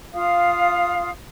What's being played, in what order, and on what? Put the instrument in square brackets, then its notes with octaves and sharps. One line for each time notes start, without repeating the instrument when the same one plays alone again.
[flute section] F4 F5 D#6